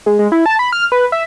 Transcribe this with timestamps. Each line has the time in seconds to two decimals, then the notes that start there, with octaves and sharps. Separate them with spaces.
0.06 G#3
0.19 G#3
0.32 E4
0.46 A5
0.59 B5
0.72 F6
0.92 B4
1.12 E5